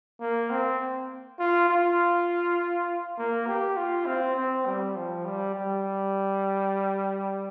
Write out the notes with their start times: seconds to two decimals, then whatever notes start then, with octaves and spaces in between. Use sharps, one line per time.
0.20 A#3
0.50 C4
1.39 F4
1.69 F4
3.17 A#3
3.47 G4
3.77 F4
4.06 C4
4.36 C4
4.66 G3
4.96 F3
5.25 G3
5.55 G3